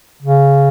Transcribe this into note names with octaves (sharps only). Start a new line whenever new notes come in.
C#3